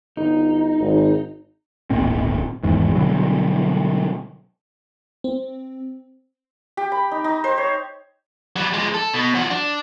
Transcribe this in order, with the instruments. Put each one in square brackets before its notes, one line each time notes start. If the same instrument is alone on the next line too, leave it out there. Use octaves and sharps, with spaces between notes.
[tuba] G1 [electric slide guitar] D#4
[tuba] G#1
[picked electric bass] D1 G#1 A#2 C4
G#1 E2 G#2
B2 D3 F#3 G3
[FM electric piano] C4
[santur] G4
B5
D#4
D#4
C5
C#5
[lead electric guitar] F#3 G3
F3 G#3
A4
B2
F3 F#4
D4